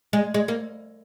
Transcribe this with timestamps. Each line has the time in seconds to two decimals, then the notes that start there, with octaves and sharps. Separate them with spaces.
0.13 G#3
0.34 G#3
0.48 A#3